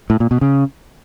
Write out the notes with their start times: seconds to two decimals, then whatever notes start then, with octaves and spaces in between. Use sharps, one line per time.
0.10 A2
0.20 A#2
0.31 B2
0.41 C#3